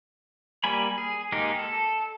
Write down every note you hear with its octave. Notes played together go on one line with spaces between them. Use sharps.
G3 A#3 G#5 B5
G#4
G#3 A#3 D#4 G4
A4